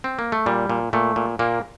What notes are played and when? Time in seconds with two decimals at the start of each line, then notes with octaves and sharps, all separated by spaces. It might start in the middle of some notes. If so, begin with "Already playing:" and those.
0.04 C4
0.19 A#3
0.32 A3
0.46 A#2 G3
0.70 A#2
0.93 A#2 A3
1.16 A#2
1.39 A#2 A#3